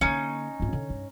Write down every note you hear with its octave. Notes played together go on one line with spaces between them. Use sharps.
D3 A#3 C#4 D#4
G#1 F4
D3
G2